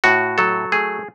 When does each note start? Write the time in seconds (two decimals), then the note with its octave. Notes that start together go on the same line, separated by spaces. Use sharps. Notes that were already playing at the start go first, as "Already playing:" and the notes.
0.04 A2 F#4
0.38 F#3 A4
0.72 A3 G#4